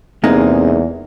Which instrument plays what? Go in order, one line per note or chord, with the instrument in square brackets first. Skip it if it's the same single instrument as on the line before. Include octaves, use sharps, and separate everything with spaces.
[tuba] E2 [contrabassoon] C3 [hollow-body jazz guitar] G#3 A#3 D#4